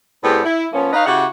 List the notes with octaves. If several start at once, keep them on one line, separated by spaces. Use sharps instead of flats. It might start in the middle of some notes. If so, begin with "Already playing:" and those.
A2 G3 B3 C4 G4 G#4
E4
F3 A#3 B3 C#4
D#4 B4 C#5 D#5 F5
C#3 E4 F#4 G4 F#5